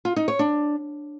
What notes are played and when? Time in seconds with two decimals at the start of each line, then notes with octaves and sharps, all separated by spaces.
0.05 F4
0.16 D#4
0.28 C#5
0.39 D4